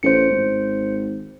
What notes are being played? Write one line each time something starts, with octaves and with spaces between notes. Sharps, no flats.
A1 C5 C#7
G#1